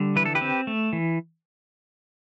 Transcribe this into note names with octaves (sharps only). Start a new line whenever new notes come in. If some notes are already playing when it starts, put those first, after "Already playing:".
Already playing: D3 G3
E3 B4
A4
G4 B4
C4
A3
E3